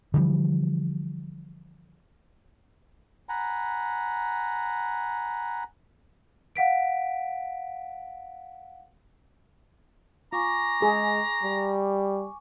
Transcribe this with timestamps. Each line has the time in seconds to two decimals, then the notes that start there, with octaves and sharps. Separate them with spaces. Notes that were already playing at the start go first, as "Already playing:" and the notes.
0.14 D3 E3 F3 G3
3.29 F#5 G#5 A#5 B5
6.56 F5 F#5 B6 D7
10.33 F4 G#5 A#5 C#6 D6
10.82 G#3 G#4
11.43 G3